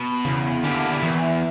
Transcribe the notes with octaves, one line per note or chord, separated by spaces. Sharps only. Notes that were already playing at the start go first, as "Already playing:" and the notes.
Already playing: B2
E2 C#3
B2 D3 A#3 E4 G4
E2 E3